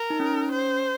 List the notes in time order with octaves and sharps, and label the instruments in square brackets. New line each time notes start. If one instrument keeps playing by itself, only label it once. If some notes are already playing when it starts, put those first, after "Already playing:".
Already playing: [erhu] A#4
[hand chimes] D#4
C#4
[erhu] C5